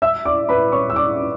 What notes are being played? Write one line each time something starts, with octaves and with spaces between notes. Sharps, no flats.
E5 E6
D5 D6
B4 B5
C#5 C#6
E6
D5 D6